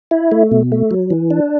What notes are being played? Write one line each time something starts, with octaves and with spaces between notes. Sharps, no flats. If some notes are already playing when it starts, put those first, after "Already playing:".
E4
A3
B2
A3
F#3
E3
D4